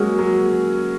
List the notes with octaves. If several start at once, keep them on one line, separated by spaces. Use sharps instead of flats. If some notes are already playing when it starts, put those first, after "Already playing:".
Already playing: F#3 G#3 A#3 C#4 F#4
F#3